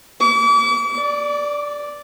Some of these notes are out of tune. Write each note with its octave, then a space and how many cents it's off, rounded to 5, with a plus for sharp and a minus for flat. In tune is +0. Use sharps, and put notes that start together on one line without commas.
D6 -40
D5 -5